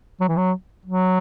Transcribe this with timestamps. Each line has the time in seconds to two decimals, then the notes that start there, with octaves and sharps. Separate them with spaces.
0.21 F#3
0.29 E3
0.37 F#3
0.86 F#3